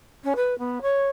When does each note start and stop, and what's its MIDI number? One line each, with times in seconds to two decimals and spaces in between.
0.24 0.33 61
0.36 0.57 71
0.58 0.78 59
0.82 1.07 73